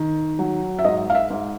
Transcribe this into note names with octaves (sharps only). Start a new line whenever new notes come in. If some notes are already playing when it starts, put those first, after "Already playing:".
Already playing: D#3
F#3
E5
G#2 D#5
F5
E5
G#2